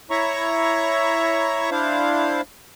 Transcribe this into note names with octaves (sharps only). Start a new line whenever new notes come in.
E4 C#5 E5 A#5 C#6
D4 E4 C5 F5